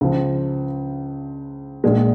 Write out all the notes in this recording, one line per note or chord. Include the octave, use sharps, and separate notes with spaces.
C#2 C#3 F3
A#1 A#2 G#3